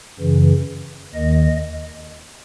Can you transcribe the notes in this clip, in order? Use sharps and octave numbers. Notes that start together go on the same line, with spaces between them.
F#2 C#3 E3
D#2 D#3 D#5